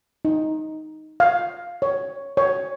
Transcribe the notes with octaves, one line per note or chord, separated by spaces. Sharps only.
D#4
F5
C#5
C#5